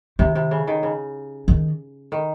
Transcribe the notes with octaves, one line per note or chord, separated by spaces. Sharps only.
C3 D#3
C3
C#3
D#3
C#3
D#3
D#3